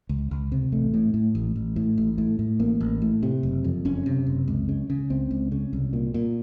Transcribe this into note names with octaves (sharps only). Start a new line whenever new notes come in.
C#2
C#2
C3
A1 A3
A2
A2
A1
A1
A2
A1
A2
A2
A1 A#3
A1
A2
C3
F#1
F2
F#1 C#4
C3
F#1
C#2
C#3
C#3
C#2 C4
C#2
C#3
C2
A#2
A#2